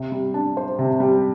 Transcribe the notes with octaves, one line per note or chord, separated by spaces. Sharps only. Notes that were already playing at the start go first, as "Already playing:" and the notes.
Already playing: C3
G3
D4
C5
C3
G3